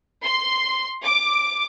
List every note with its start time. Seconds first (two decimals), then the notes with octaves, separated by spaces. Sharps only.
0.23 C6
1.04 D6